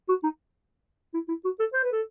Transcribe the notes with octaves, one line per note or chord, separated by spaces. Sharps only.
F#4
D#4
E4
E4
F#4
A4
C5
B4
A4